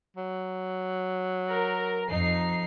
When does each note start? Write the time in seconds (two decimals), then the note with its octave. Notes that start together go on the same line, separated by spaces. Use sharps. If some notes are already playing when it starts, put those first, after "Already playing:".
0.17 F#3
1.49 A#4
2.09 F2 D#4 C7